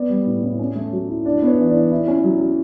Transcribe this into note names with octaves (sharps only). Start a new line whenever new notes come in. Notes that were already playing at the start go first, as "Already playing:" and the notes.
Already playing: B3 D5
G3
A2
A2
C#4
A3
F#3
E4
D4 D5
B3 C#5
E3
D5
E3
E4
C#4
F#3
F#3